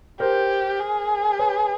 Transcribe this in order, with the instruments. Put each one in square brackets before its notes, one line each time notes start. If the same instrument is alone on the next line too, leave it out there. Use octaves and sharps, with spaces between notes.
[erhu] G4 [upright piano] A#4 C5
[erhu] G#4
[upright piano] B4 C#5